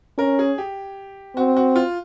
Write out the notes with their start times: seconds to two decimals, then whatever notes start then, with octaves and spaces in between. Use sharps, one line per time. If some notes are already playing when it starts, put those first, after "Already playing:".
0.18 C#4 A#4
0.39 G#4
0.58 G4
1.36 C4 F#4
1.57 F#4
1.76 F4